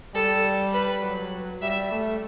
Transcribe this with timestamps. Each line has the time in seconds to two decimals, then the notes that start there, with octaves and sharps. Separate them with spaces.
0.15 G3 A4
0.73 B4
1.02 F#3
1.61 G3 E5
1.91 A3